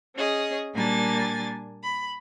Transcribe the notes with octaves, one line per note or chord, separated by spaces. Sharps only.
C#4 G#4 D#5
A#2 G3 A#3 D4 G#5 A6
B5